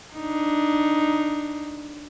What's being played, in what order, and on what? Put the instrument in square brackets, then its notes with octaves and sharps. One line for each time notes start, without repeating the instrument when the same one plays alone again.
[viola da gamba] D4 D#4